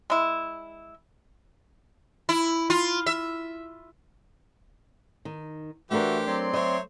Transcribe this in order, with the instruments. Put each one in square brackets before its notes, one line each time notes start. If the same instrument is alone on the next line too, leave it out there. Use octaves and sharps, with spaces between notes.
[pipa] G#3 E4
[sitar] E4
F4
E5
[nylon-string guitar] D#3
[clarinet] E3 [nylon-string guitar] A3 D4 A#4 [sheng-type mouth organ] F#4 E5 [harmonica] G4 C5
[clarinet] F#3 [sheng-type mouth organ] C4 D5 C6
[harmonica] C5 C#5 [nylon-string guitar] D#5 E5